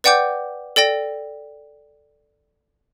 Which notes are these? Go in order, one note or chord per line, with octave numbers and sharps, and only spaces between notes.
B4 D5 F#5 G5 D6 G6
A4 D5 G5 A#6